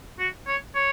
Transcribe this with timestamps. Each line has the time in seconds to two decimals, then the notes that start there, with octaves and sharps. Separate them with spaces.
0.19 F#4
0.47 C#5
0.75 C#5